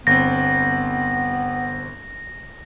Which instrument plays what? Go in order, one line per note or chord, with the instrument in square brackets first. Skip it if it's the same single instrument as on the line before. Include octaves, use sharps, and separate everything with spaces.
[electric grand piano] G1 C4 [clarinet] B3 [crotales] A#6